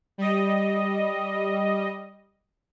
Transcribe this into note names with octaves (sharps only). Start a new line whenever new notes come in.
G3 D#5